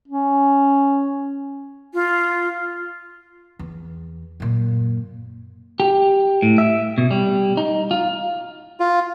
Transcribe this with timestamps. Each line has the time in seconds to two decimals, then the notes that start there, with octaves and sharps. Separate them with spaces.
0.08 C#4
1.94 F4
3.59 E2
4.40 F#2 A#2
5.80 G4
6.42 A2
6.58 E5
6.98 B2
7.11 G3
7.57 D#4
7.91 F4
8.80 F4